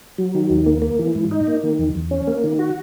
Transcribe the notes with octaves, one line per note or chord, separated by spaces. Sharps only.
F#3
D#3
D#2
A#3
A#3
E3
G#2
D#4
A#3
D#3
E2
E2
C#4
A#3
D#3
F#4